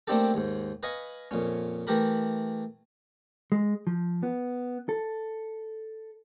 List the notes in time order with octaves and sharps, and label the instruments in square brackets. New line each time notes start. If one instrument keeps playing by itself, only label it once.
[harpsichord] A3 A#3 C4 D4 G4 A4
D#2 G#2
B4 D#5 F5 G#5 B5 C#6
F2 A#2 C#4
E3 A3 G4 A#4 B5
[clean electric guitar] G#3
F3
B3
A4